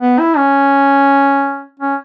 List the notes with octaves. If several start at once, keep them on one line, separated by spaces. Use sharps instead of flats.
B3
E4
C#4
C#4